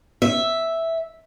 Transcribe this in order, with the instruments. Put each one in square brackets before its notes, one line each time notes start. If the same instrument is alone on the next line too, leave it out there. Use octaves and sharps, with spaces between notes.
[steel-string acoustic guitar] E5